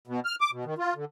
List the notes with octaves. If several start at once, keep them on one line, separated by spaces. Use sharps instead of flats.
B2
F6
D6
B2
D#3
F4
D3